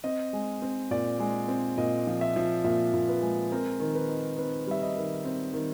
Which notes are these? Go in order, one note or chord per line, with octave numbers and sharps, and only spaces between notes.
C4 D#5
G#3
C4
A#2 D5
G#3
C4
A#2 D#5
F3
E5
F3
A#2 E5
A#2
B4
G#3
C4 A#4
D#3
B4
D#4
C4 B4
G3 E5
D#5
D#3
C4
D#3